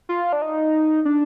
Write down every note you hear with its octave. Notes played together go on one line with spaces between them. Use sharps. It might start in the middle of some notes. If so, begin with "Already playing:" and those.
F4
D4
D#4
D4